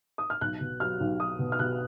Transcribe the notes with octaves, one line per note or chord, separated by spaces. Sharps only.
D#6
F6
B1 F#6
B2
F#3 F6
B1
F#3 D#6
B2
F6
B2 F#6